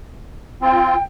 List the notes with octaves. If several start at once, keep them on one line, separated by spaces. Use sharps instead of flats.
C4 F4 G5